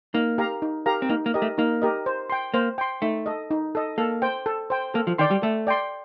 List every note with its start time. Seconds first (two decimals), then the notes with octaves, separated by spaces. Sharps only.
0.14 A#3 D#4
0.38 G4 A#4 F5 A#5
0.62 D#4
0.86 G4 A#4 F5 A#5
1.02 C4
1.09 A#3 D#4
1.26 A#3
1.34 G4 A#4 D#5
1.42 A3
1.58 A#3 D#4
1.82 G4 A#4 D#5
2.06 C5
2.30 G5 C6
2.54 A#3 C5
2.78 G5 C6
3.02 A3 D#4
3.26 A4 D#5
3.51 D#4
3.75 A4 D#5
3.98 A#3 A4
4.22 C5 G5
4.46 A4
4.70 C5 G5
4.94 A#3 A4
5.07 F3
5.18 D#3 D5 G5 C6
5.31 G3
5.42 A3 A4
5.67 D5 G5 C6